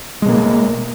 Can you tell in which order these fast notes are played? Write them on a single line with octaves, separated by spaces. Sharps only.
G#3 B2 A#3